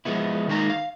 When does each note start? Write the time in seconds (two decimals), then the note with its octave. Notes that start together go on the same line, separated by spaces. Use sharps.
0.05 F3 G#3 B3 E4
0.48 D#3 G#3 A#3 D#4 D#5 A#5
0.70 F5